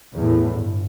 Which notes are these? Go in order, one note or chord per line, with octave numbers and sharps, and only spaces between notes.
E2 A2
G1